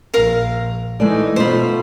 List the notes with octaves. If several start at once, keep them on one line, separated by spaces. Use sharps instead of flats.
A#1 A#4 F5
E3 G#3 A3 D#4 D5
B2 A3 D#4 F4 C5 B5